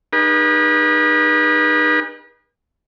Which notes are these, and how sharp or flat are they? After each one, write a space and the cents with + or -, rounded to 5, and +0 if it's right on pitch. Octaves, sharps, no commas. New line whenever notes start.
D#4 -30 G#4 -40 B4 -40